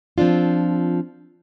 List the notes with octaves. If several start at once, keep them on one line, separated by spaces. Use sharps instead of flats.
F3 C4 D4 F4